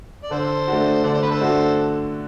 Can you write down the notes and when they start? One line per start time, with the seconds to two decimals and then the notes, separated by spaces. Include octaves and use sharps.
0.24 D5
0.31 D3 A4 C5
0.68 A3 D4 F#4
1.04 D3 D5
1.14 C5
1.23 B4
1.31 A4 C5
1.41 A3 D4 F#4